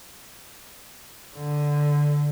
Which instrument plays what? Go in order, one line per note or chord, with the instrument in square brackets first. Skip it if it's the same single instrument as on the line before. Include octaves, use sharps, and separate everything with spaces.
[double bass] D3